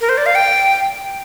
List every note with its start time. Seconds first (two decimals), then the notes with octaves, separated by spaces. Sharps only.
0.01 A#4
0.09 C5
0.17 D5
0.26 F5
0.35 G5